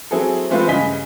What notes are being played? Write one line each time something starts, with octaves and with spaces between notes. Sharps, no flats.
F#3 C4 E4 G#4 A4
E3 G#3 A3 C4 F4 B4
G2 C#3 D#5 G#5 B6 G7